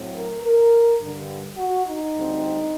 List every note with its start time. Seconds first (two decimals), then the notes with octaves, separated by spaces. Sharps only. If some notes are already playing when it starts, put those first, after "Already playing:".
Already playing: A2 F#3 C4
0.14 A#4
0.43 A#4
1.00 G2 D3 G3
1.57 F#4
1.85 D#4
2.14 D2 D3 G3 C4